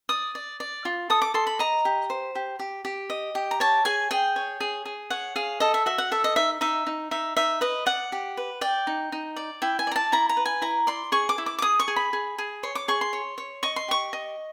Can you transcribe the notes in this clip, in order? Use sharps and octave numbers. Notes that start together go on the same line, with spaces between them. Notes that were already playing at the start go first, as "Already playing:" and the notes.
D5 D#6
D5
D5
F4
A4 D#6
D6
A4 C6
B5
D#5 A#5
G4
C5
G4
G4
G4
D#5
G4
A#5
C#5 A5
G#4 G#5
G#4 G5
C#5
G#4
G#4
C#5 F#5
G#4 F5
A4 D#5
E5
F#4 E5
F#5
A4 E5
D#5
D#4 E5
D#4 E5
D#4
D#4 E5
D#4 E5
B4 D#5
D5 F#5
G4
B4
D5 G5
D#4
D#4
D5
E4 G5
G#5
D5 A#5
A5
E4 A#5
A#5
B4
G#5
E4 A#5
D5 C6
G#4 C#6
D6
E4
D6
D6
G#4 D#6
C#6
G#4
B5
G#4
G#4
C#5 C6
D6
G#4 C#6
C6
C#5
C#5
D#5 C#6
C6
G4 C#6
D#5